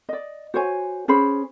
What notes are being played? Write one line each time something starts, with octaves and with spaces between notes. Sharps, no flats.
D5 D#5
F#4 C5 C#5 G#5
C#4 G#4 C5 B5